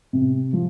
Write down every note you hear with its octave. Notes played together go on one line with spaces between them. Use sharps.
C3
F3